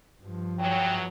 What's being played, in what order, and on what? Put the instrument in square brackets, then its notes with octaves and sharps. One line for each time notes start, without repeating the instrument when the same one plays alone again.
[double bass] G2 F3
[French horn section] E2 F#3 [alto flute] G5